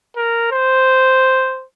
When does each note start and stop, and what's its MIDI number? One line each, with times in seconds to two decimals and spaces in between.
0.17 0.50 70
0.51 1.65 72